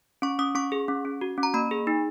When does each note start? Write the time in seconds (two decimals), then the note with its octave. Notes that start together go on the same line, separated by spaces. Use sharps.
0.22 C#4 C#6
0.39 C#4 D#6
0.55 C#4 C#6
0.72 G#4
0.88 C#4
1.05 C#4
1.21 F#4
1.38 C#4
1.43 A#5
1.54 A#3 B5
1.71 G#4
1.87 D#4